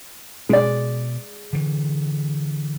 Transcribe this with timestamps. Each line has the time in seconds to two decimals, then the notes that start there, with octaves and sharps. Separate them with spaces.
0.49 B2 G#3 D5
1.53 D3 E3